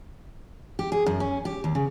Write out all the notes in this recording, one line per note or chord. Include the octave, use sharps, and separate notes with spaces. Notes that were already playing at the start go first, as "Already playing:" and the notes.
G4
G#4
F#2
C#4
G4
D#2
C#3